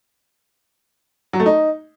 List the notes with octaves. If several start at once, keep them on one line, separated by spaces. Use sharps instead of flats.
F#3
A3
D#4